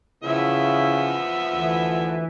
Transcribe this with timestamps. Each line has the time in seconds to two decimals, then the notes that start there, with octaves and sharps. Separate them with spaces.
0.24 C#3 F3 B3 E4 E5
1.52 D2 E3